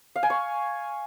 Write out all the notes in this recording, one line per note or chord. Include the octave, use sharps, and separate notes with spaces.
F5
G#5
C#6